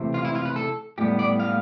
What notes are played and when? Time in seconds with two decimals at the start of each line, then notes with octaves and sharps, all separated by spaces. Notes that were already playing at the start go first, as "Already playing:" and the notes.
Already playing: C3 E3 A3 C4
0.14 F4
0.25 E4
0.35 F4
0.45 B4
0.56 A4
0.98 A2 G3 B3 G4
1.19 D5
1.40 F5